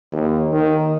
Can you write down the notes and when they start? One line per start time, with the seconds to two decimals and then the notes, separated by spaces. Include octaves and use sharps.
0.12 D#2
0.52 D#3